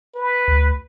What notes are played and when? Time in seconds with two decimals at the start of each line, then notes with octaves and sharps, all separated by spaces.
0.15 B4
0.48 D2